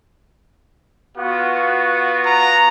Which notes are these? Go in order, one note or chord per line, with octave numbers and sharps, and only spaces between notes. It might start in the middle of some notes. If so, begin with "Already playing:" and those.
B3 F4 F#4
A#5